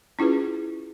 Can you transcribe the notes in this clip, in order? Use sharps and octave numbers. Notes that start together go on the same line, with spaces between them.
C#4 E4 F4 G#4 B4